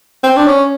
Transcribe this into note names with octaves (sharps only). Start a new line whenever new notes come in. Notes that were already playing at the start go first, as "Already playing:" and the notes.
C4
D4
C#4